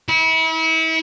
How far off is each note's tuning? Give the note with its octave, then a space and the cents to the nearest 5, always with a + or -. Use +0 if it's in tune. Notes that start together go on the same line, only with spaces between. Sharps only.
E4 -35